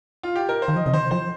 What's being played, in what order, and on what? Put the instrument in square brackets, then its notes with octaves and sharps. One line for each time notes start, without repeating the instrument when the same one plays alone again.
[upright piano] F4
G4
A#4
C5
[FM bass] D#3
[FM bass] F3 [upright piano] D#5
[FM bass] C3 [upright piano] D#5
[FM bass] D#3 [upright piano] C5
[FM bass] F3 [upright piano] C5